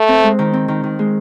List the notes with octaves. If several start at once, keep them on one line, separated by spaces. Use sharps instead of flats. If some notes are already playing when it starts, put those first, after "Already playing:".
Already playing: A3
C4
G#3
D#3
C4
D#3
D#3
G#3